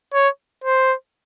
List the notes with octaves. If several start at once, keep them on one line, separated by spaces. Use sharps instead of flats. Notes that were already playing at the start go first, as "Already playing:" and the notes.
C#5
C5